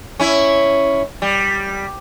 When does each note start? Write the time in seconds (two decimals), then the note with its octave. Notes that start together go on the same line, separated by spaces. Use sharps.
0.20 C#4 E4
1.22 G3